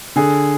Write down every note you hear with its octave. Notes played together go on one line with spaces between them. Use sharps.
D3 G#4